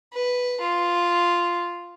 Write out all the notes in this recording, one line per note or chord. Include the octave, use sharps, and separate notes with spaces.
B4
F4